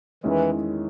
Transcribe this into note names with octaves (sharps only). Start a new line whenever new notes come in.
E2 D#3 E3 G#3 C#4 E4